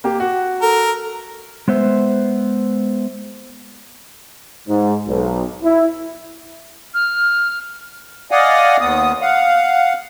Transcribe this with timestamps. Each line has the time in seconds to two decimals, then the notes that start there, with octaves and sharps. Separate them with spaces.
0.04 A#3 G4
0.20 F#4
0.62 A4 A#4
1.68 G#3 B3 C5 E5
4.68 G#2
5.08 B1
5.63 E4
6.94 F6
8.31 D5 D#5 F5 F#5 G#5 D#6
8.80 D#2 B3 D#6
9.21 F5 F#5